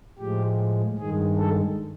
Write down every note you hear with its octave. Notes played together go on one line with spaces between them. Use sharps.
A2 F3 G#3 G4
G2 D#3 G#3 G#4
A4